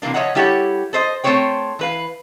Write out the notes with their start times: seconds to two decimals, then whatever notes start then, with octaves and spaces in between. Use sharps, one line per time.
0.02 C3 E3 A#3 D4
0.14 F3 A#3 C#5 D#5 E5 F#5
0.35 G3 E4 G4 A4 C#5 F#5
0.93 A4 C5 D#5
1.24 A3 C4 F4 C5 C#5 G5
1.79 E3 B4 F5